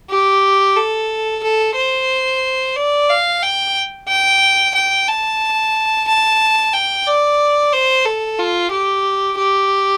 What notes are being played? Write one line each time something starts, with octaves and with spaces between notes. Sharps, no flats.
G4
A4
A4
C5
D5
F5
G5
G5
G5
A5
A5
G5
D5
C5
A4
F4
G4
G4